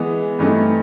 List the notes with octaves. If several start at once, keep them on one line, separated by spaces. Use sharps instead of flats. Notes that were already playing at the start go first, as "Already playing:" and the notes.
Already playing: E3 G#3 B3
G2 E3 A3 C4 D#4